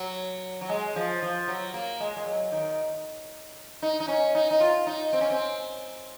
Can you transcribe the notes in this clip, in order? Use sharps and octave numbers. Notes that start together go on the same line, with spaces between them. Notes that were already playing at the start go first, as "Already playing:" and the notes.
Already playing: F#3
F#3
G#3
F3
F3
F#3
A#3
G#3
G#3
F#3
D#3
D#4
D#4
C#4
D#4
D#4
F4
D#4
C4
C#4
C4